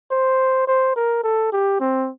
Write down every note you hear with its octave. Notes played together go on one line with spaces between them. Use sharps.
C5
C5
A#4
A4
G4
C4